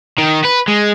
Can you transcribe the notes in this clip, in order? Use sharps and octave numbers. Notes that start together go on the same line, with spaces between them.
D#3
B4
G#3